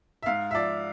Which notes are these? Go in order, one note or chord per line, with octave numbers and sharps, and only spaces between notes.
E5
G#2 F5
E5
F3 D5